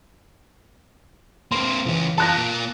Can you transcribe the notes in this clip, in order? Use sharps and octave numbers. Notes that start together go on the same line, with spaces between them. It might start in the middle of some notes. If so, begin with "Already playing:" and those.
A#3 C4 C6
C#2 E3 C#4
F4 A4 A5 F#6 A#6
A#3 F4